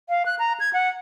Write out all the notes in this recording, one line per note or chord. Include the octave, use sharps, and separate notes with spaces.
F5
F#6
A#5
G#6
F#5